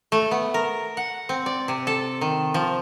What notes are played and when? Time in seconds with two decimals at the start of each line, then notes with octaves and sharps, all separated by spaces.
0.12 A3
0.31 B3
0.54 A#4
0.97 F#5
1.29 C4
1.46 D5
1.68 C3
1.87 A4
2.21 D#3
2.54 F3